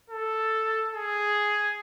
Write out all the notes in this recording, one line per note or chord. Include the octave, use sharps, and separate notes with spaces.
A4
G#4